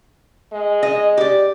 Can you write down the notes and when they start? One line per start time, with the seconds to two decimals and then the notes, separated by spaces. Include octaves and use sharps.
0.52 G#3
0.83 D#5
1.17 G4 D5